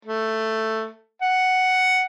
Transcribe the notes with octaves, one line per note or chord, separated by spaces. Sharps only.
A3
F#5